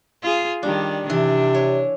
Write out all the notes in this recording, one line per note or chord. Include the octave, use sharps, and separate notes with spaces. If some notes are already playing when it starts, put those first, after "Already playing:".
F4 G#4
D#3 G3 D4
C3 E3 D4
C#5